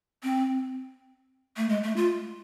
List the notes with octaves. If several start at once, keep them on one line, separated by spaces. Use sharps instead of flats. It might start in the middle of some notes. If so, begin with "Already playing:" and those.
C4
A3
G#3
A3
F4